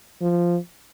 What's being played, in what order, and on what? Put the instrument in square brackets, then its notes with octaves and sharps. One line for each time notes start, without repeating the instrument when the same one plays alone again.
[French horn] F3